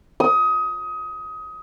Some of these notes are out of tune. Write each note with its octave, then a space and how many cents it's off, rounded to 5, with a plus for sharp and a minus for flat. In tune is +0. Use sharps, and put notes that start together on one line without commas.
D#6 +25